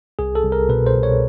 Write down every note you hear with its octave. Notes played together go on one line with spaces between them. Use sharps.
C2 G#4
A4
C2
A#4
B2 B4
C5
C2
C#5